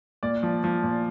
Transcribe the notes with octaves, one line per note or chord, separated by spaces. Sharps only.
A#2 D5
F3
F3
A#2